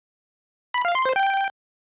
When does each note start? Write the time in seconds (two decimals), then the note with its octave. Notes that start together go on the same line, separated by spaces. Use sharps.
0.74 B5
0.85 F5
0.95 C6
1.06 C5
1.16 G5